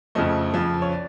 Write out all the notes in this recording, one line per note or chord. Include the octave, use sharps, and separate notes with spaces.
F2 C#3 F3 A3 D#5
F2 C#3 F3
C#5
D5